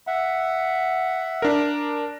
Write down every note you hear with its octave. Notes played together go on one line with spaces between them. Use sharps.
E5 F#5
D4 A#4